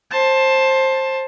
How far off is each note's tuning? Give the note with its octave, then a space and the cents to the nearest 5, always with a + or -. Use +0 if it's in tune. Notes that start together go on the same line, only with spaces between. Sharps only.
C5 +20 A5 +0